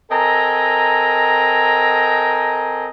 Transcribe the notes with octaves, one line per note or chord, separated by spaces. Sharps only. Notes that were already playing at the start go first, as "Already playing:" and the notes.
C4 A4 A#4 D#5 G#5 A#5